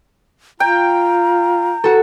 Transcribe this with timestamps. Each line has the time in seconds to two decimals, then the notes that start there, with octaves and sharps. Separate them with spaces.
0.60 F4 G5 A#5
1.84 F#4 A4